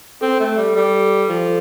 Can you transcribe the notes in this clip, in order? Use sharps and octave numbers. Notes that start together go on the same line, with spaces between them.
C4 A4
A3
G3
G3 A4
F3 A4